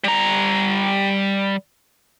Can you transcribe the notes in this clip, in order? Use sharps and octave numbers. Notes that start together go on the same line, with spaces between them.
G3 A#5